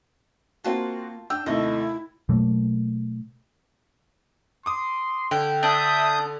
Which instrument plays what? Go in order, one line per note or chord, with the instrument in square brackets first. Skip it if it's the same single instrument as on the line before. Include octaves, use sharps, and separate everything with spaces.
[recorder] A#3 [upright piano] C4 F#4 [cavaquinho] F4 A5
[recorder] D4 [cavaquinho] G5 [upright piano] E6
[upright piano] D#2 C3 A3 [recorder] E4 [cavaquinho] D#5
[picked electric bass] B2 F#3 A3 A#3
[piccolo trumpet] C6 [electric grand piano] D6 D#6
[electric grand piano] D3 [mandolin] G5
[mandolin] D4 [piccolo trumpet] E5 [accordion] D#6 G6